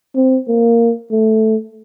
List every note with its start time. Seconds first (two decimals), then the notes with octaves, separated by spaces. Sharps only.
0.16 C4
0.48 A#3
1.11 A3